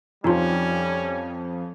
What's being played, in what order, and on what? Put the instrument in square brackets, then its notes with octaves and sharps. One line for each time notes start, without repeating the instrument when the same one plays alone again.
[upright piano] F2 F3 [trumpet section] G3 C#4 [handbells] D#4 F4